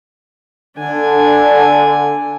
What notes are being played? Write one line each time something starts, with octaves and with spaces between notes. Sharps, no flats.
D3 D4 G#5